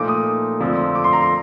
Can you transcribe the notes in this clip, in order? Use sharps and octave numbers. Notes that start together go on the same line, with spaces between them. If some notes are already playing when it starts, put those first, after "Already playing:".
Already playing: A#2 F3 A3 D#4 D6
D#6
F2 D3 F3 A3 C4
D6
C6
A#5
C6